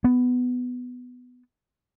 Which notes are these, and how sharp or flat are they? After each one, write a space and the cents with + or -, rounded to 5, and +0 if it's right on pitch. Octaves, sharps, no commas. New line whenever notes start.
B3 +10